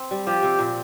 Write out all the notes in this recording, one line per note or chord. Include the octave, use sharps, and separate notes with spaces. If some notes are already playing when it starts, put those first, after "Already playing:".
Already playing: C4
G3
F3 G4
C3
A#2